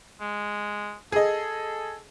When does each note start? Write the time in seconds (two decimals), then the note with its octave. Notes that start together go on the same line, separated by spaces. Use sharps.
0.21 G#3
1.12 G#4 A4 D#5